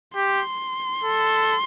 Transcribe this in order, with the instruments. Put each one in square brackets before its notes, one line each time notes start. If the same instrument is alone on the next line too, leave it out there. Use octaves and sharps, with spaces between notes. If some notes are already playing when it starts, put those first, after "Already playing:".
[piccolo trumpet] G4 [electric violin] C6
[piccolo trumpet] A4